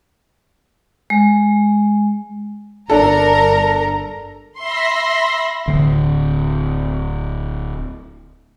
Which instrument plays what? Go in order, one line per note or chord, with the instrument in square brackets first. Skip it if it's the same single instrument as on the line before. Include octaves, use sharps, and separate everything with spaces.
[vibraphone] G#3
[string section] G1 A#4 A#5 [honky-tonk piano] D4 A4
[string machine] E5 B5 A#6 [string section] C6
[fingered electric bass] D1 D2